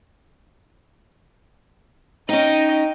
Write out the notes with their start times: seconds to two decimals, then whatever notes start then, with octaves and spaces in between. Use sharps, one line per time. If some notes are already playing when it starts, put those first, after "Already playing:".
2.29 C#4 D#4 D#5 G5